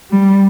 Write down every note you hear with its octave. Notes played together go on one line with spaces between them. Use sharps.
G3